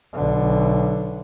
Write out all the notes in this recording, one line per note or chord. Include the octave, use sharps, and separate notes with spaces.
B1 D3